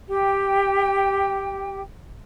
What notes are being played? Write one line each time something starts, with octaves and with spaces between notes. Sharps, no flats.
G4 G5